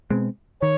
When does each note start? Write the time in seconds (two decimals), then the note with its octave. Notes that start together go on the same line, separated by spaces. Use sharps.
0.10 B2 G#3 C4
0.61 D#3 C#5